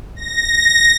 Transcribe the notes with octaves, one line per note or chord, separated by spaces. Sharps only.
A#6